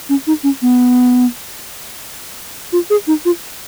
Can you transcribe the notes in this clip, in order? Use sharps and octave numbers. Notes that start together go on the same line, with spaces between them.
C#4
D#4
C#4
B3
F4
G#4
D#4
F4